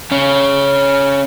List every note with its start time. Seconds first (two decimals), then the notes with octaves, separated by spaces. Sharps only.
0.11 C#3 C#4